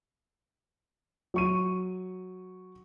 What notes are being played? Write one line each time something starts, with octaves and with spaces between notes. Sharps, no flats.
F#3 C#6 D#7